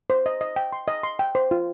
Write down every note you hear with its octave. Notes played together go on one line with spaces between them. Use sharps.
C5
D#5
D#5
G5
C6
D#5
C6
G5
C5
F4